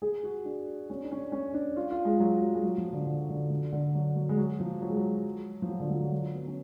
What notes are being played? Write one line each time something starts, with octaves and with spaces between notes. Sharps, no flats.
G#4
F#4
D4
C#4
D4
C#4
C#4
D4
F4
F4
G#3
F#3
F#3
G#3
F#3
F3
D3
D3
D3
D3
D3
F#3
F#3
G#3
F#3
F3
F#3
G#3
F#3
F3
F#3
D3
F3
F#3
F#3
B3
C#4